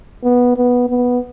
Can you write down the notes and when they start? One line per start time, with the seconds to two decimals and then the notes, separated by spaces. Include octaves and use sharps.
0.24 B3
0.56 B3
0.89 B3